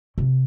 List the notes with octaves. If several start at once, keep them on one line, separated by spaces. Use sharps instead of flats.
C3